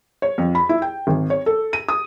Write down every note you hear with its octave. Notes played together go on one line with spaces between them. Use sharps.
C#5
F2
B5
E4
G5
G#1
C#5
A4
D#7
D#6